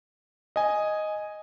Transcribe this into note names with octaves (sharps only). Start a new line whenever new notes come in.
D#5 G#5